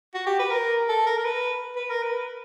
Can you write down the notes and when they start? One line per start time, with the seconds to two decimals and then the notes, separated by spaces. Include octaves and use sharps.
0.15 F#4
0.27 G4
0.39 B4
0.51 A#4
0.89 A4
1.07 A#4
1.18 A#4
1.26 B4
1.76 B4
1.90 A#4
2.03 B4